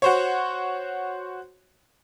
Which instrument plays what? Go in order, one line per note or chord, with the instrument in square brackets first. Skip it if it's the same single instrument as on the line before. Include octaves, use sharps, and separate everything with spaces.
[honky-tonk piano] F#4 C5 C#5